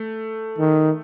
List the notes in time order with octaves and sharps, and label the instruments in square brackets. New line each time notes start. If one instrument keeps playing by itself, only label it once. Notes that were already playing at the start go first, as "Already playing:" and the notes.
Already playing: [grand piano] A3
[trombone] D#3